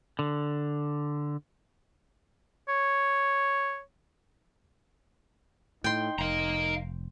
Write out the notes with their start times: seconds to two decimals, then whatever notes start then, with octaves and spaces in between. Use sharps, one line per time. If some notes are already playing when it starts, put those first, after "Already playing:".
0.19 D3
2.69 C#5
5.84 A2 D#4 G5 C6
6.18 F1 D#4 F5 A#5